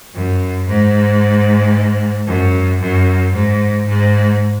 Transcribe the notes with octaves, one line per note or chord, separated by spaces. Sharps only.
F#2
G#2
F#2
F#2
G#2
G#2